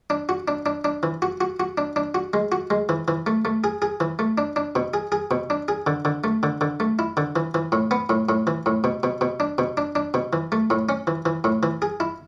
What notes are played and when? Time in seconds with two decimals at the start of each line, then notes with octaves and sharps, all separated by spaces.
0.10 D4
0.29 F#4
0.48 D4
0.66 D4
0.85 D4
1.03 E3
1.22 F#4
1.41 F#4
1.60 F#4
1.78 D4
1.96 D4
2.15 F#4
2.33 G#3
2.52 F#4
2.70 G#3
2.89 E3
3.08 E3
3.26 A3
3.45 A3
3.64 G#4
3.82 G#4
4.00 E3
4.19 A3
4.38 D4
4.56 D4
4.75 B2
4.94 G#4
5.12 G#4
5.31 B2
5.50 D4
5.68 G#4
5.87 D3
6.05 D3
6.24 A3
6.43 D3
6.61 D3
6.80 A3
6.99 E4
7.17 D3
7.36 E3
7.54 E3
7.72 A2
7.91 B3
8.09 A2
8.29 A2
8.47 E3
8.66 A2
8.84 B2
9.03 B2
9.21 B2
9.40 D4
9.58 B2
9.77 D4
9.95 D4
10.14 B2
10.33 E3
10.52 A3
10.70 A2
10.89 C#4
11.07 E3
11.26 E3
11.44 A2
11.63 E3
11.82 G#4
12.00 E4